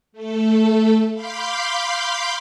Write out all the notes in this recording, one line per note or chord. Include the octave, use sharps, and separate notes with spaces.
A3 A4
F5 B5 C6 D6 G6